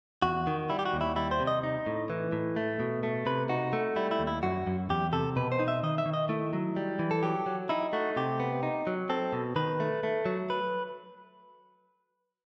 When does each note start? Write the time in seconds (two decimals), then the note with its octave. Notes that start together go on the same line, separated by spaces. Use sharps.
0.22 E2 F#4
0.47 D#3
0.70 G3 E4
0.79 G4
0.85 F#4
0.94 D#2
1.01 E4
1.16 G3 E4
1.31 C5
1.40 C3
1.47 D#5
1.63 D#4
1.86 A2
2.10 E3
2.32 A2
2.56 A3
2.80 B2
3.03 A3
3.26 C3 B4
3.49 D#4 F#4
3.73 A3
3.96 G3 E4
4.11 E4
4.19 D#2
4.27 E4
4.43 F#2 F#4
4.67 F#2
4.90 E2 G4
5.13 C3 A4
5.36 B2 B4
5.52 C5
5.60 D#4
5.68 E5
5.83 D#3 D#5
5.98 E5
6.06 D#3
6.14 D#5
6.29 A3 E4
6.53 F#3
6.76 G3
6.99 E3
7.11 A4
7.23 F#3 G4
7.46 F#3
7.69 D#4 E4
7.93 A3 F#4
8.16 C3 G4
8.40 B3
8.63 D#4
8.87 F#3
9.09 C4 A4
9.33 B2
9.56 D#3 B4
9.80 A3
10.03 A3
10.26 F#3
10.50 B4